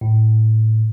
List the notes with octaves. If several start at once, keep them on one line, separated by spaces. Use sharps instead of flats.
A2